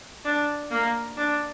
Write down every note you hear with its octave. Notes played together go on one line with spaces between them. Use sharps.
D4
A#3
D4